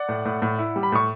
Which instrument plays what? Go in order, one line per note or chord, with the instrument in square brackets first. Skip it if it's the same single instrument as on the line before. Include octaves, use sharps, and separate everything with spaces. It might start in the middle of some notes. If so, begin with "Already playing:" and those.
Already playing: [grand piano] D5 F#5
A2
A2
A2
E4
G3
B5
A2 C#6